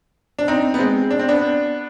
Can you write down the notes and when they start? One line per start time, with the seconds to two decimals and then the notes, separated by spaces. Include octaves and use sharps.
0.39 D4
0.48 C4 D#4
0.74 B3
0.79 G#3 C4
1.11 D4
1.19 C4
1.29 B3 D4